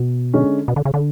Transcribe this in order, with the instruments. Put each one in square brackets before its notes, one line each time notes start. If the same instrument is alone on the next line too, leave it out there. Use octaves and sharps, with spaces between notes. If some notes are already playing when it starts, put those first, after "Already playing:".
Already playing: [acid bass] B2
[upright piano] D3 G#3 C#4
[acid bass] B2
D3
C#3
D3